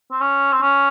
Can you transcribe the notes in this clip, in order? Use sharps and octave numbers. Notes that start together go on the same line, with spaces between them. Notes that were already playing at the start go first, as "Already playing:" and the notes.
C4
C#4
C4
C#4